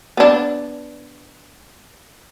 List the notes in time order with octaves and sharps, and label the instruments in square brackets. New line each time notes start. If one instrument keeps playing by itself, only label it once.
[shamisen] B3 D4